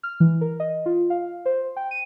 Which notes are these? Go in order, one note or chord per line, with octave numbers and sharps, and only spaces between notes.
F6
E3
A#4
D#5
F4
F5
C5
G5
D#7